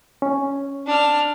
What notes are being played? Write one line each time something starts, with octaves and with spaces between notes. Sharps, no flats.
C#4
D4 F6